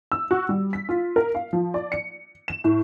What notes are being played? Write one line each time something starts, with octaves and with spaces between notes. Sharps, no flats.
E6
F#4
G3
B6
F4
A#4
F5
F3
D5
C#7
E7
A2